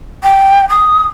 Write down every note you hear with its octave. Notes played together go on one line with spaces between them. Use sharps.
G5
D#6